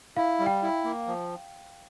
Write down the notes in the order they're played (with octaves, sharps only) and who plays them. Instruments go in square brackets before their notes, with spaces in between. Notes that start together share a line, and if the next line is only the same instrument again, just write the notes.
[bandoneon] E4 [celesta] F5
[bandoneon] G3
[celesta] G5
[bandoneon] E4
A#3
F3